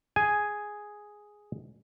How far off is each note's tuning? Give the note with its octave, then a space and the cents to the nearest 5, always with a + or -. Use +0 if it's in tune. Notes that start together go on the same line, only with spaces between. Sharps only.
G#4 +0 G#5 +0